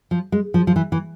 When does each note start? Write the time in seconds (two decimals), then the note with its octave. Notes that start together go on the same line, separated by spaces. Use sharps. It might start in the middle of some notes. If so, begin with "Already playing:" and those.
0.11 F3
0.32 G#3
0.54 F3
0.67 F3
0.76 E3
0.92 E3